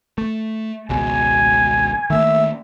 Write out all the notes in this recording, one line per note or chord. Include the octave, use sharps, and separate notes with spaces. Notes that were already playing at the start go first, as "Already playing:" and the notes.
A3
G#1 C#2 B2 G#5
D#3 A3 A#3 E5